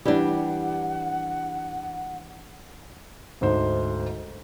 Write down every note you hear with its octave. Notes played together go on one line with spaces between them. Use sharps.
E3 G3 D4 G4 F#5
D2 G#2 C5